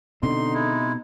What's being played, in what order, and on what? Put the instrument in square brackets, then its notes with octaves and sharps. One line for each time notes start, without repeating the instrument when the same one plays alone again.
[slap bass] B2 C4 [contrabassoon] D3 [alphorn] D#4 [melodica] C6
[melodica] G#3 E4